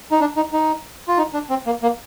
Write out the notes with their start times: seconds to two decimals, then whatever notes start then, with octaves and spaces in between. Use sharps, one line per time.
0.11 D#4
0.20 D4
0.36 D#4
0.53 D#4
1.08 F4
1.18 D#4
1.34 D4
1.50 C4
1.66 A#3
1.82 A#3